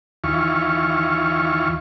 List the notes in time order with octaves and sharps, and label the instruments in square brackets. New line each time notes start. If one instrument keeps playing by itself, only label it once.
[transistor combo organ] D#2 E3 F4 C#6